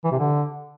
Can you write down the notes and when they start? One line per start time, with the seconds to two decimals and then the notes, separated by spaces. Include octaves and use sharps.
0.04 E3
0.12 C3
0.19 D3